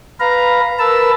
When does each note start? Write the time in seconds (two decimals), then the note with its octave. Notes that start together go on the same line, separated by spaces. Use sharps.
0.20 B4 F5 A#5
0.79 A#4 B4 A5 E6